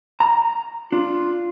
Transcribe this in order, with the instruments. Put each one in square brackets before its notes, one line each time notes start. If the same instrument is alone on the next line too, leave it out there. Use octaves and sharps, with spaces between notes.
[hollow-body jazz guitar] A#5
[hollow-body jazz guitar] D4 [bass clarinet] F4